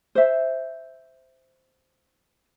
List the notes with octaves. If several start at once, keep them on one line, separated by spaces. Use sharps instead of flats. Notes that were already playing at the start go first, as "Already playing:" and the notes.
C5 E5